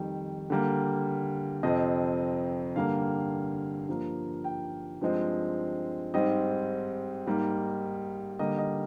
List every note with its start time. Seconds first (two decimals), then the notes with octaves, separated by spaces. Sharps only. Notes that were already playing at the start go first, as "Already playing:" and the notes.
Already playing: F2 D#3 G3
0.50 D3 G3 A#3
1.63 F2 C3 F3 C4 D#5
2.76 G2 D3 G3 A#3 F5
3.88 G2 F3 A#3
4.44 G5
5.01 G2 F3 G#3 C4
6.14 G#2 G3 C4 D#5
7.26 G#2 G3 A#3
8.39 D3 G3 A#3 D#5
8.58 D#5